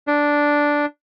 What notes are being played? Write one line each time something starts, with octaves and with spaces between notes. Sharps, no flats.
D4